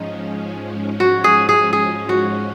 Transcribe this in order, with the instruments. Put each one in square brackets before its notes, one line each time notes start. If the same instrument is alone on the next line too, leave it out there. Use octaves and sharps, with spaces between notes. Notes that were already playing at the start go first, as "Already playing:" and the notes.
Already playing: [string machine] G#2 F3 G#3 C#4 [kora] D#4
[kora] F#4
G#4
G#4
G#4
F#4